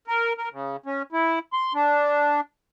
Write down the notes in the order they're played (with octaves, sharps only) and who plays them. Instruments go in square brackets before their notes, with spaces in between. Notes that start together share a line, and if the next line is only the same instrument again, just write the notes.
[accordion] A#4
A#4
C#3
C#4
E4
C6
D4